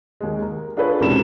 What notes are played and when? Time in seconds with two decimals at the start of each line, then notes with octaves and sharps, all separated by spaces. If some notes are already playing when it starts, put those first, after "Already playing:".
0.21 D#2 G#3
0.42 A#4
0.77 D4 F4 G#4 A4 B4 C#5
1.01 E1 G#2 C3 C#4 A4 E7